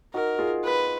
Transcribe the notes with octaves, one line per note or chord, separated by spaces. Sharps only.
D#4 F#4 A#4
F4 G#4
B4